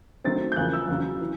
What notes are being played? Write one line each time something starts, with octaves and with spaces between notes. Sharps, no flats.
D#3 F#3 A3 C4 A6
G6
E2 C#3 F3 A#3 F#6
E6
E2 C#3 F#3
E3